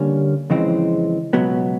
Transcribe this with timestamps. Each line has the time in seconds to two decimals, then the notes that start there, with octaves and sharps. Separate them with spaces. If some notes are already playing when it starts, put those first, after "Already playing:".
Already playing: D3 G3 A#3 C#4
0.50 F2 C#3 E3 G#3 C4
1.33 C#2 B2 F#3 B3